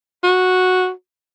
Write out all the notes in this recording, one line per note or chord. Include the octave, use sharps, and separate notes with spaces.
F#4